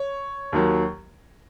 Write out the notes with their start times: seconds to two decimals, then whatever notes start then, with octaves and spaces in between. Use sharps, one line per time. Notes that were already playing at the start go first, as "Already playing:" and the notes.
Already playing: C#5
0.52 D#2 D#3 F#3